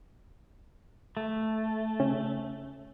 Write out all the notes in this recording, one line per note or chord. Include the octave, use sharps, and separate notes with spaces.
A3
C#3